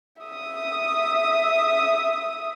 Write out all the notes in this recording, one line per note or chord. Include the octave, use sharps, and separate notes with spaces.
E5 D#6